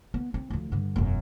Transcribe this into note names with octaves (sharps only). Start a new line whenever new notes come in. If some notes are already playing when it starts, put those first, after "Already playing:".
B3
C4
D2 F3
G2 D3
E1 F#2